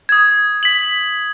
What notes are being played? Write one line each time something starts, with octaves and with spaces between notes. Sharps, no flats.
D#6 G#6
B6 F#7